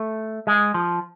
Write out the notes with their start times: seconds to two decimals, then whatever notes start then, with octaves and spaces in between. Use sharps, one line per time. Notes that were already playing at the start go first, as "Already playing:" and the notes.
Already playing: A3
0.47 G#3
0.74 F3